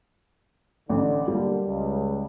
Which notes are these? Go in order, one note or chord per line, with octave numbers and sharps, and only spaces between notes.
A1 D3
B1 D3 G3 A#3
C#2